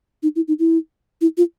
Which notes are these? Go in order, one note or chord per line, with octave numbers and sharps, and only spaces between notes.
D#4
E4
D#4
E4
E4
F4